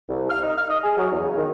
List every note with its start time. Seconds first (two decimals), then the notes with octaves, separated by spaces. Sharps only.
0.09 C2
0.30 F6
0.42 D#4
0.56 F6
0.69 D#5
0.83 G#4
0.97 F#3
1.11 E2
1.23 C#3
1.36 D#3